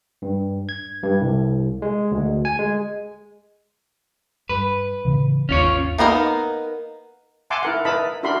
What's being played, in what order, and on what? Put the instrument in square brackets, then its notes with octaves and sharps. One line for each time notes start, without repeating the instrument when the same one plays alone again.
[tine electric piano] G2
G#6
G2
C2
G#3
D2
G#5
G#3
[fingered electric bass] G2 [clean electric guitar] B4
[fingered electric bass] A2 C#3 E3
[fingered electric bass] G#1 D#2 [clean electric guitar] C#4 F4 C#5
[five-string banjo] A#3 B3 D#4 A#4
[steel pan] E5 F#5 G#5 A5 C6 D6
E4 A#4 F#5
E4 A#4 B4 D#5 A5 B5
D4 E4 F#4 A#4 B5 C6